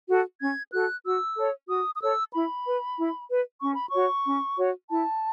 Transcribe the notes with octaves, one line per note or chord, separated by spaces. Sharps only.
F#4 A4
C#4 G#6
F#4 A4 F#6
F#4 E6
A4 C#5
F#4 D#6
D#6
A4 C#5 E6
E4 B5
B4
E4
B4
C#4 C#6
B5
C#6
F#4 C#5
C#4
F#4 C#5
E4 A5